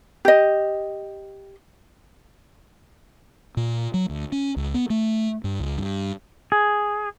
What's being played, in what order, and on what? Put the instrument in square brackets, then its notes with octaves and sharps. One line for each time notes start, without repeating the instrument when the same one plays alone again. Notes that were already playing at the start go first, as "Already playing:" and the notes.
[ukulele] G4 D#5
[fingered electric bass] A#2
F#3
D2
C#4
C#2
B3
A3
G2
C#2
G2
[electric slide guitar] G#4